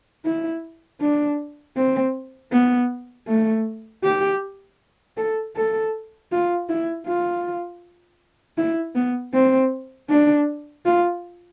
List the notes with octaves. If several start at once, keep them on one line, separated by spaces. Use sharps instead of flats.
E4
D4
C4
B3
A3
G4
A4
A4
F4
E4
F4
E4
B3
C4
D4
F4